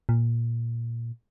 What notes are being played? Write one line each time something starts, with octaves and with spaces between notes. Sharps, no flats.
A#2